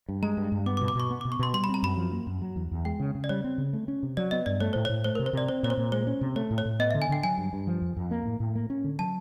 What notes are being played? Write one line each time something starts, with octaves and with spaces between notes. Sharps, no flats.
G2
G#3 A#5
G2
G2
B3 D6
D6
B2
D6
B2 C#6
B3
B2 D6
C#6
B2 C6
G3 C6
B5
C4
A#5
F#2 B5
F3
A#3
F#2
F#3
E2
E2
G#3 G5
C#3
C#3
D5
G3 C#5
C4
C#3
A3
C#4
C3
F#3 D5
B3 D#5
G2 D5
A3 C#5
A2 C5
A2 C#5
A3 C5
C3 A#4
C5
C3 D5
C4 C5
A#2 C#5
C5
A#2
G#3 C5
C#4
C3
A3 C#5
A2
C#5
A2
B3 D#5
D3 E5
G#5
D3 G5
F#3 G#5
G2
G2
F3
F2
F2
A#3
A2
A2
A#3
C#4
D3
F#3 A5